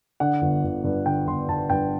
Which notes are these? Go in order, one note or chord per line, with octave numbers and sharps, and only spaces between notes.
D3 F#5
G1
G1
G2
D3 G5
G1 C6
G1 A5
G2 G5